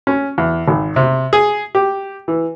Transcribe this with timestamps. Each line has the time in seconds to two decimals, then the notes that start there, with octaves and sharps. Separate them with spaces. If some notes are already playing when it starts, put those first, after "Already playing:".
0.07 C#4
0.38 E2
0.68 G#1
0.96 C3
1.33 G#4
1.75 G4
2.28 E3